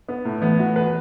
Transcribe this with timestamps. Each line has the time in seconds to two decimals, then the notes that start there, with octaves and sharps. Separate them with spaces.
0.09 B3
0.25 A2
0.42 E3 A3 B3
0.59 F#4
0.76 B4